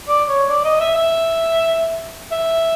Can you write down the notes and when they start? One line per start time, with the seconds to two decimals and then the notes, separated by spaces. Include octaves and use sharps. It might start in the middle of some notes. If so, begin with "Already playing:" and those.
0.09 D5
0.29 C#5
0.50 D5
0.65 D#5
0.80 E5
0.96 E5
2.32 E5